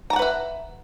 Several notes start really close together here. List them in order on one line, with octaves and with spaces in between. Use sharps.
A#5 A5 F#5 B4 E5